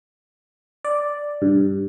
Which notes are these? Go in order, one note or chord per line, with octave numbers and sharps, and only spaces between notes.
D5
G2